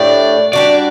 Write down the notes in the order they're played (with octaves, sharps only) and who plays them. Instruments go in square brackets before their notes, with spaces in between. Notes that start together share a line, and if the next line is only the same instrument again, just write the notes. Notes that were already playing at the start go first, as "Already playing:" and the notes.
Already playing: [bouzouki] A2 A3 D4 G4 [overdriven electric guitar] D5
[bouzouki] G3 D4 F#4 [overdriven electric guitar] D5